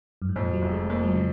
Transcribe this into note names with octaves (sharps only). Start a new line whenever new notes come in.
F#2
G#2
F2 A#2
F#3
F1
G#3
F2 A#3
G#3
F#3
C#3